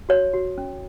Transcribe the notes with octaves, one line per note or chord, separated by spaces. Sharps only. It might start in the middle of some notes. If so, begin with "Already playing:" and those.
F#4 C#5
F#4
C#4